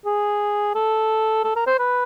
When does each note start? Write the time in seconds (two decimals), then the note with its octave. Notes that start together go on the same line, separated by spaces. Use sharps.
0.06 G#4
0.75 A4
1.44 A4
1.56 A#4
1.67 C5
1.79 B4